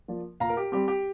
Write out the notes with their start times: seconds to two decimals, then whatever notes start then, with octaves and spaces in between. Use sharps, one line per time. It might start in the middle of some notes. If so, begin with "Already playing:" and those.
0.08 F3 A#3 D4
0.40 A#2 F5 A#5
0.49 A#4
0.57 G4
0.72 G3 C4 G4
0.88 G4